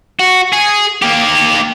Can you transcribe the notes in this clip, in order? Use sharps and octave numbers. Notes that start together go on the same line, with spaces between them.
F#4
G#4
A#3 G4